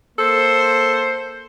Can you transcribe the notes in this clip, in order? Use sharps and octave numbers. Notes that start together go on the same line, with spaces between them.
A#3 A4 C5